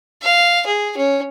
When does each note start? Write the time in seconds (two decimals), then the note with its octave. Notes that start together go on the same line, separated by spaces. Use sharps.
0.23 F5
0.67 G#4
0.97 C#4